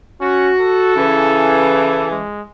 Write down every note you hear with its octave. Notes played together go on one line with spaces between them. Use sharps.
C#4 F#4
A4
C#3 E3
G#3